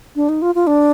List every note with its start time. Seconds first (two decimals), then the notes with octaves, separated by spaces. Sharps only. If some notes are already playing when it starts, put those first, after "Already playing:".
0.16 D4
0.29 D#4
0.42 F4
0.55 F4
0.67 D4